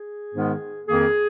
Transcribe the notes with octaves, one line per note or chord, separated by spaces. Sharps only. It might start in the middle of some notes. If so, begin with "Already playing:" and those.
Already playing: G#4
G#2 D#3 G#3 B3
F2 D#3 A#3 G#4